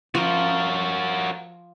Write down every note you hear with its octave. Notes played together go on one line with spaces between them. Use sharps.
F3 F#4 A#4